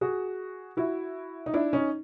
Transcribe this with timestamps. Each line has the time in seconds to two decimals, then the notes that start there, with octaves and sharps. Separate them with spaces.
0.01 F#4 G#4
0.77 E4 F#4
1.46 D#4
1.54 D4 E4
1.73 C#4 D#4